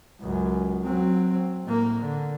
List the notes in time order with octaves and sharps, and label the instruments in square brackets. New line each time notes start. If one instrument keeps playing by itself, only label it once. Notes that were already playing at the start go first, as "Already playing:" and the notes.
[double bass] C#2 F#2
F#3 C4
A2 A#3
D3